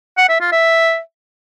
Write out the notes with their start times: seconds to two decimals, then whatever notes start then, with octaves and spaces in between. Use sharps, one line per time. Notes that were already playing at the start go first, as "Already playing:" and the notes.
0.18 F#5
0.29 E5
0.40 F4
0.52 E5